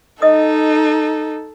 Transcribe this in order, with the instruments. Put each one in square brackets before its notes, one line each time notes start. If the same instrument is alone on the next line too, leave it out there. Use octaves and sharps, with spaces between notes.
[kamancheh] D#4 A4 [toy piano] D#5 D#6